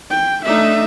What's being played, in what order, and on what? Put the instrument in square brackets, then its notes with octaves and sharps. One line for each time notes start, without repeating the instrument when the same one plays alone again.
[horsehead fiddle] G5
[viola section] A3 D4 D#4 [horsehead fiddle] E5